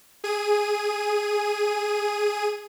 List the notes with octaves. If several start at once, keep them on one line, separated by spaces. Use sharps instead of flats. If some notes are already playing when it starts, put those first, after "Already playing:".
G#4 D#7